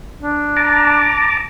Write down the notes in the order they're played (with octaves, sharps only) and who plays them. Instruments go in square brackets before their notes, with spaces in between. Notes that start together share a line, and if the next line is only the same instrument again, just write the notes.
[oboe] D4
[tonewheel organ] A5 A#5 D6